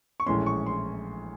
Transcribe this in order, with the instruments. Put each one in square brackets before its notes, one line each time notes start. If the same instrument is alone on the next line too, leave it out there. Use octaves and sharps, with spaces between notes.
[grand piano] C#6
A#1 A2 E3 G#3 C#4 C6
C#6
C6